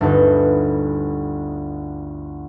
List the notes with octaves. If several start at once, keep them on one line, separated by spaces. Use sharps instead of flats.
G1 D2 D#4 G4 B4 G6